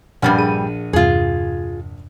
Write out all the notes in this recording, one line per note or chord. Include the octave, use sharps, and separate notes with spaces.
A#1 G2 G3 F#5 G#5 F6
G#4 D#7
E2 G2 C3 F4 G#4